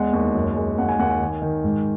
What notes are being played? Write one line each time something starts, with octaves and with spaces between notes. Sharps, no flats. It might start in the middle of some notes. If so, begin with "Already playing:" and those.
Already playing: E2 G#3 F#5
D#2
F#2
G#3
D#2 F#5
G#5
D#2 F#5
G#5
D#3
D#3
G#2